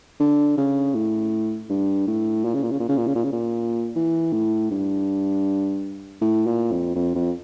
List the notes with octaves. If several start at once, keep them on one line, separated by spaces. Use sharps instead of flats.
D3
C#3
A2
G2
A2
A#2
C#3
A#2
C#3
A#2
C#3
A#2
C#3
A#2
C#3
A#2
E3
A2
G2
A2
A#2
F2
F2
F2